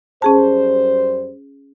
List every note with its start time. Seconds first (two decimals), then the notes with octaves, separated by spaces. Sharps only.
0.22 F#2 G3 C#4 G#4 C5 A5